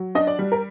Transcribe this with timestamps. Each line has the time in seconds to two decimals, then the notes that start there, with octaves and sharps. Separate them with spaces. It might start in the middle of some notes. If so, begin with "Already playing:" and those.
Already playing: F#3
0.15 D4 D#5
0.27 D5
0.39 G3
0.52 A#4